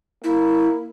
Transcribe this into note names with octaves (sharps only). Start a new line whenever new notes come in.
A#3 E4